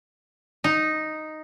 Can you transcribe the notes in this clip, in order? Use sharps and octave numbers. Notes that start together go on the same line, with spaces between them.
D#4